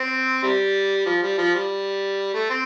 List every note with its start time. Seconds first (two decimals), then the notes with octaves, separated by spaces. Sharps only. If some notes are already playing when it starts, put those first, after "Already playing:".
Already playing: C4
0.43 C3 G3
1.06 F3
1.23 G3
1.38 F3
1.55 G3
2.34 A3
2.50 C4